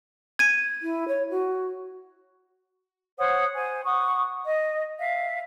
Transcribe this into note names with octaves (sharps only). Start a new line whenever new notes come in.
G#6 D#7
E4
C#5
F#4
C5 C#5 F#5 D#6
C5 G#5
F#5 C#6 D#6
D#5
E5 F5